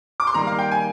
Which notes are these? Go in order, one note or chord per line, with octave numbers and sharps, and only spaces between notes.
D6
C6
D#3 G3 A#3 A#5
F5
G5
G#5